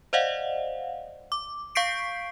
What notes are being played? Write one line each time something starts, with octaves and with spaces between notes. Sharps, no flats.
C5 D5 D#5 F5 F#5
D6
F5 C#6 G6 B6 C7 D7